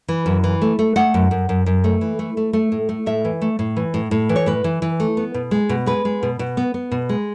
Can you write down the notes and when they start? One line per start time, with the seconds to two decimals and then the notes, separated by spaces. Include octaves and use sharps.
0.08 E3
0.26 F#2
0.44 E3
0.62 A3
0.79 A3
0.96 A3 F#5
1.14 F#2
1.31 F#2
1.49 F#2
1.66 F#2
1.84 A3
2.01 E3
2.19 A3
2.37 A3
2.53 A3
2.72 A2
2.89 A3
3.06 A2 E5
3.25 E3
3.41 A3
3.59 A2
3.77 E3
3.94 A2
4.11 A2
4.29 E3
4.36 C#5
4.46 A2 B4
4.64 E3
4.82 E3
5.00 A3
5.17 B3
5.34 B2
5.51 G#3
5.69 B2
5.86 G#3 B4
6.05 G#3
6.23 B2
6.39 B2
6.57 B3
6.74 B3
6.91 B2
7.09 G#3